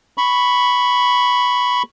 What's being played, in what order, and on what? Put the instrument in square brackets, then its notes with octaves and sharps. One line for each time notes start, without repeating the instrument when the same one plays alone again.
[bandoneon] B5 C#6